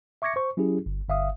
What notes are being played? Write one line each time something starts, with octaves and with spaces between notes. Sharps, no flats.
E5 C#6 D6 G#6 A#6 C#7
C5 C#6
F#3 C#4 E4 G4 G#4
G1
G1 E5 F5 D#6